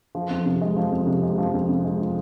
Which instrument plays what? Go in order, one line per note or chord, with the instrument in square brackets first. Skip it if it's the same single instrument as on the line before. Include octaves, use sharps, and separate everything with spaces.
[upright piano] F3
F2
C3
G#3
F3
F2
C3
G#3
F3
F2
C3
G#3
F3